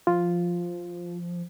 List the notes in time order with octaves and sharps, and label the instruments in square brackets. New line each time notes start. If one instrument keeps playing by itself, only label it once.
[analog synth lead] F3 [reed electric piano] F4